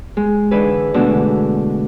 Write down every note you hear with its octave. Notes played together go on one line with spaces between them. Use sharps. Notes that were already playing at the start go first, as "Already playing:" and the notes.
G#3
D3 E3 D#4 E4 G#4 B4
B2 D3 E3 G#3 A3 F#4